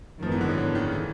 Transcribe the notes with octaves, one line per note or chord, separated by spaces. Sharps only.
G#1 F#2 D#3 F3 G#3 B3
E3
D3
C#3
D3
D#3
E3